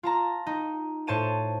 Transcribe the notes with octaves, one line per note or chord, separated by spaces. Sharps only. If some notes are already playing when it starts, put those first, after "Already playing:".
F4 A5 A#5
D#4
A2 C5 C#5 A5 D#7 E7